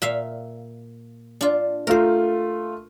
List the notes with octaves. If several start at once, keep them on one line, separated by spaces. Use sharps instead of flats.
A#2 E5 F5
D4 F4
A3 F4 A#4 C5